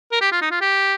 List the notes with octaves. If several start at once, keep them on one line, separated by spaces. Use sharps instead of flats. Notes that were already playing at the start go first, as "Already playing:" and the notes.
A#4
G4
F4
D#4
F4
G4